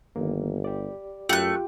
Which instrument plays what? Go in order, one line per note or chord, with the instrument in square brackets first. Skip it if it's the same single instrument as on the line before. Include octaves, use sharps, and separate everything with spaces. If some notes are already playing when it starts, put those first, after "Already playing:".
[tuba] G1 [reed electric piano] D#3 A#3
[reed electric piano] G4 D5
[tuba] F#2 [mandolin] A3 F#6 [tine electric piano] F4 G4 G5